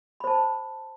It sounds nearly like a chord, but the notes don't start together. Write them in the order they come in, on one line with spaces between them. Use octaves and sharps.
B5 C5 A5